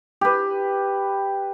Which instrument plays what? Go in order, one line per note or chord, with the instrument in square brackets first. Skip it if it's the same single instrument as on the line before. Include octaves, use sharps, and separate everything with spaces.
[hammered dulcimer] G4 B4